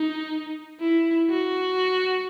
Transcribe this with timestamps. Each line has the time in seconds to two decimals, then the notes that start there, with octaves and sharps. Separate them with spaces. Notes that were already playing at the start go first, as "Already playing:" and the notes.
Already playing: D#4
0.80 E4
1.30 F#4